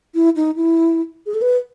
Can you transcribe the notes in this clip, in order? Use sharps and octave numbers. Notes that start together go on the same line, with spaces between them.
E4
D#4
E4
G#4
A4
B4